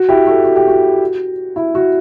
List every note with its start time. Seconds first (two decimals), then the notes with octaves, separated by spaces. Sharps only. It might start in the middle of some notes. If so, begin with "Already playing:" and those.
Already playing: F#4
0.09 E4 G4
0.27 F#4 A4
0.45 F#4
0.56 G4
0.68 F#4
1.56 E4
1.75 F#4